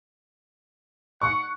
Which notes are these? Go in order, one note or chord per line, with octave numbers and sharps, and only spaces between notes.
F#5 C#6